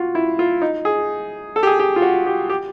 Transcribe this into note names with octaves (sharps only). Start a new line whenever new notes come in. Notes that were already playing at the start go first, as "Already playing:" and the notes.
Already playing: F4 F#4
E4
F4
D#4
G#4
A4
G4
G#4
G4
F4
F#4
G4
G4